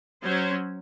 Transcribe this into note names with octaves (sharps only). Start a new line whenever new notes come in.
F#3 C#4 C5